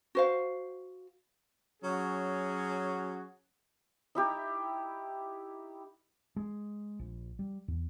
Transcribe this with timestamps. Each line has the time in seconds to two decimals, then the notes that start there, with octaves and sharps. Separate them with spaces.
0.15 F#4 C5 F5
1.82 F#3 C#4 F#4 G#4
4.15 D#4 E4 G4
6.36 G#3
6.99 A#1
7.39 G3
7.68 E2